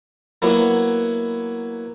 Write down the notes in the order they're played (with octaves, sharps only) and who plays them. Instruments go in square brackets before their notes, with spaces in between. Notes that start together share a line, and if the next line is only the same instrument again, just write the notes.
[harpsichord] F#3 A#3 B3 E4